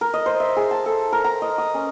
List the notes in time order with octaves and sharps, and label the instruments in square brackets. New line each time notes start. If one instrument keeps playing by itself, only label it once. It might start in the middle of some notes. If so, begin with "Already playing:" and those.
[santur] A#4
D#5
C5
E5
G#4
A5
A4
A#4
A#5
D#5
D#6
C#4